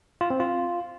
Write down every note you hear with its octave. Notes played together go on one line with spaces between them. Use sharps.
F4
C4
F4